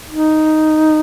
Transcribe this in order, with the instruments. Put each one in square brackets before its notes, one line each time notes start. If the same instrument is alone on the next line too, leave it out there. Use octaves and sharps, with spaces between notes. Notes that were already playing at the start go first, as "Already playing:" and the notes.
[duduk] D#4